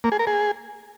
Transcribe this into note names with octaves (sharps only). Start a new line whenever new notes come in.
A#3
G#4
A#4
G#4